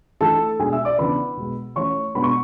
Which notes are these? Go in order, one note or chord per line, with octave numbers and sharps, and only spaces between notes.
E3 A3 D4 A4 A5
B2 G#3 D4 G#4 G#5
E5 E6
D5 D6
C#3 E3 B3 D4 B4 B5
B2 G#3 B3
E3 A3 C#4 C#5 C#6
B2 G#3 B3 D4 B5
C#6